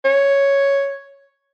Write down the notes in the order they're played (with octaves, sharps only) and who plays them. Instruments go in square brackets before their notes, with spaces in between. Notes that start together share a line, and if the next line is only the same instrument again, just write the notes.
[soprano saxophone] C#5